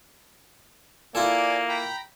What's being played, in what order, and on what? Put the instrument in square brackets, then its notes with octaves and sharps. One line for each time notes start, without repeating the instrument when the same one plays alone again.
[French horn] A#3 [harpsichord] E4 F4 A4 [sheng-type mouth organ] D5 G#5
[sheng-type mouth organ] G5 A#5 B5